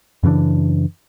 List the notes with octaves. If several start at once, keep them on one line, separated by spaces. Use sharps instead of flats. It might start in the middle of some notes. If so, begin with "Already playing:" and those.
F#2 C#3 E3 D4